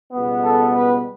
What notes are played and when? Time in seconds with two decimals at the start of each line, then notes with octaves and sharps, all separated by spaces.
0.13 C#2 B2 G3 B3
0.43 A4
0.74 B4